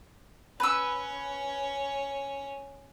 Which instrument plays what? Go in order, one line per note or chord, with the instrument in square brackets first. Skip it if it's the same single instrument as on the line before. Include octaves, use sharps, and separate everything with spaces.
[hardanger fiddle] C#4 C#5 [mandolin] B4 E6